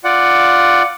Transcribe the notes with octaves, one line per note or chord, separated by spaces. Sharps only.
F4 D5 F#5